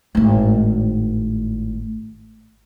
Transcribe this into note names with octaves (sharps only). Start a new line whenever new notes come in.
G#1 A2